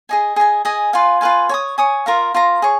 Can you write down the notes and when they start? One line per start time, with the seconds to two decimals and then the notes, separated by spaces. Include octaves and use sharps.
0.09 G#4 D#5 G#5
0.36 G#4 D#5 G#5
0.65 G#4 D#5 G#5
0.93 F4 B4 F5 G#5
1.21 F4 B4 F5 G#5
1.49 C#5 G#5
1.54 D#6
1.78 C#5 G#5 D#6
2.06 F4 A#4 F5 A#5
2.34 F4 A#4 F5 A#5
2.62 G#4 C#5